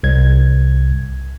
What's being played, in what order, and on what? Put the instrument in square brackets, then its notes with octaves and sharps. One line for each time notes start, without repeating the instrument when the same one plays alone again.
[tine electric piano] C2 G#6